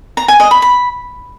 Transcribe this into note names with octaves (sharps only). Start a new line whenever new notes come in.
A#5
G#5
D#5
B5
B5